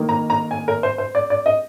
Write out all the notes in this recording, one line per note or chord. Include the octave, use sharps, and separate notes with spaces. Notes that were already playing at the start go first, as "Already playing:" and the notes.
Already playing: D#3 A#3 D#4
A#5
A#5
G#5
A#4
C5
C5
D5
D5
D#5